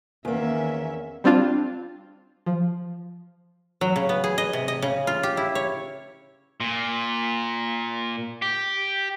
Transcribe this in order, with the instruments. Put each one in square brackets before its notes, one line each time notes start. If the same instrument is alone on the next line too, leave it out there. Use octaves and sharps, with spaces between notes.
[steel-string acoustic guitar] E2 A#3 [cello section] D#3 C#4 E5
[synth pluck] G3 C4 D4 F4
F3
[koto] F#3
C#3
B3
G#4
D#5
C3
D#5
C#3
F4
G4
E4
C#5
[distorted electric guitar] A#2
G4